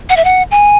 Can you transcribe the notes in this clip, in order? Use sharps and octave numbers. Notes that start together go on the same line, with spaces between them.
F#5
E5
F#5
G#5